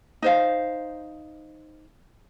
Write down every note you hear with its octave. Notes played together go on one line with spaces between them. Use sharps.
D#4 C5 F5